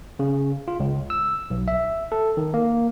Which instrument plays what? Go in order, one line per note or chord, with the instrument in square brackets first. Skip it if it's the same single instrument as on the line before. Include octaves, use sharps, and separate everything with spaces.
[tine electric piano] C#3
F4
C#2
E6
B1
E5
A4
D#3
A#3